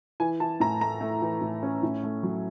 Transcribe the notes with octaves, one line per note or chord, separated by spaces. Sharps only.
E3 G#5
E3 A5
A2 A#5
A3 A#5
A3
E3
A2
C#4
A2
A3
F#3